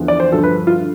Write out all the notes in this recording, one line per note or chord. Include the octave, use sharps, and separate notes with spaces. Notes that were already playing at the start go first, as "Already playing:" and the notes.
Already playing: E2 D3 F3
D5
C5
G2 D3 F3 A4
B4
F4
D3